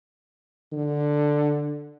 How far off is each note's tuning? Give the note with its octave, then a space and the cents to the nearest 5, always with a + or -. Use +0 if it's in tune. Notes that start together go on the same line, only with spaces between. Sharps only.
D3 +5